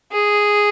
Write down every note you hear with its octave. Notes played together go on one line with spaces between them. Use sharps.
G#4